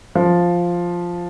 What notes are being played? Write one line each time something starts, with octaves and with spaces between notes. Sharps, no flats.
F3